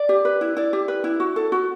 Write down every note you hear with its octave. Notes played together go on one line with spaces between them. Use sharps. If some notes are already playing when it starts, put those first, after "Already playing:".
Already playing: D5
G4
B4
E4
E4 D5
G4
B4
E4
F#4
A4
F#4